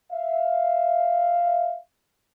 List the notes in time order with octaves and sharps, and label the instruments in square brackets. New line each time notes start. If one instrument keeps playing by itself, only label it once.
[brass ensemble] E5 F5